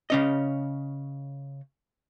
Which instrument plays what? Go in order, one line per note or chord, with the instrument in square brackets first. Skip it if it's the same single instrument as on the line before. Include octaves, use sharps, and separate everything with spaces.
[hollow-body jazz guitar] C#3 C#4 D#5